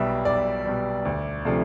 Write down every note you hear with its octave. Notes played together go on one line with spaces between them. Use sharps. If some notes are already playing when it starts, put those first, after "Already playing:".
Already playing: B1 B2 G3 E5
B1 D5
B2 G3
D2
C3 F3 A3 D4